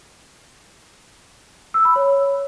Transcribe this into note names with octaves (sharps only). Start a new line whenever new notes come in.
E6
B5
C#5